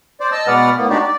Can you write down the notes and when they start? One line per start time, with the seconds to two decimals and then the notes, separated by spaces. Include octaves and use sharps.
0.20 C5 D5
0.32 D#5 A5 E6
0.47 B2 G#3 B4 D5 F#5 F6
0.77 A2 A#3 B3
0.90 G#3 D4 D#4 F#4 G4 D5
1.02 D5